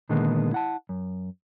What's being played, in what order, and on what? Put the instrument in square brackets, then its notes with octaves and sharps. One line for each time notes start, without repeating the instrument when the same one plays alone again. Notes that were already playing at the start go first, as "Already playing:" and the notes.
[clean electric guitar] A#2 D3 D#3 G#3 A#3 B3
E4 F#5 A5
F#2